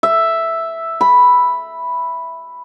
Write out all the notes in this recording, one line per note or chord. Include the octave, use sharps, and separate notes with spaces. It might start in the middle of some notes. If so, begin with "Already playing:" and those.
E5
B5